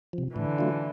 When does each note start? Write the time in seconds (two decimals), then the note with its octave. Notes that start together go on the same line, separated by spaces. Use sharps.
0.13 C3 F3
0.35 A2 D3 E3
0.58 F#3 A3 D4 F4